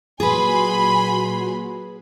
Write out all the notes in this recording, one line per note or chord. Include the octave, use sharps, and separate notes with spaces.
A#2 F#3 F#4 G#4 B4 G#5 B5 C6